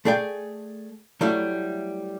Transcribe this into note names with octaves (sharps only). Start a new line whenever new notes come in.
A3 G#4 D5 G5
F#3 G3 A3 E4